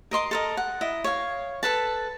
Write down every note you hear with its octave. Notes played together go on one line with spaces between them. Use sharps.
A#4 D#5 C6 D6
A4 A#4 D#5
F#5
E4 D#5
C#5 F5
A4 B4 A5